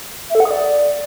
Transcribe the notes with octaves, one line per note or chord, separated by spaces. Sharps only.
E5
A4
F#5
D#6
D5